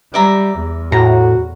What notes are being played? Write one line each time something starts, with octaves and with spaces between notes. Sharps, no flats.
G3 D5 E5 A#5
E2
A2 F#4 A#5